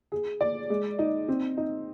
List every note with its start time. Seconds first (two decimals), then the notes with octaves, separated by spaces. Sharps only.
0.12 G#4
0.41 D5
0.70 G#3
0.99 D#4
1.28 C4
1.57 D#4